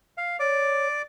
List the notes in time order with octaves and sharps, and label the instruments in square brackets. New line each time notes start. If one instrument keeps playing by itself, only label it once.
[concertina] F5
[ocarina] C#5 [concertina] D5 D6